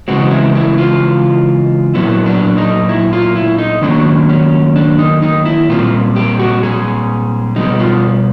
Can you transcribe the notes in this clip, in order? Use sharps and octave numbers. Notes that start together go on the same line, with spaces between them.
C#3 E3 G#3 C4 F#4
E4
E4
F4
A#2 F#3 B3 E4
D4
D#4
E4
F4
E4
D#4
F#2 D#3 F#3 A#3 C#4 D4
C#4
D4
D#4
D#4
E4
A#2 G3 C4 F4
G4
F#4
G#4
B2 G3 B3 D#4
F4